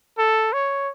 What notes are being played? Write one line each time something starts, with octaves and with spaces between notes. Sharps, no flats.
A4
C#5